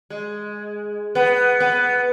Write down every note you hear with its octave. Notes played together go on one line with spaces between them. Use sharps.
G#3
B3
B3